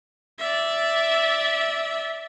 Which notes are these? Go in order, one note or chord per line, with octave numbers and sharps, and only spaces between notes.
D5 E5